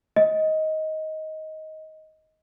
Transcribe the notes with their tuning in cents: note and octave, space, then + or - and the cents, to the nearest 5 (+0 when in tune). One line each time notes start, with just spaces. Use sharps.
D#5 +15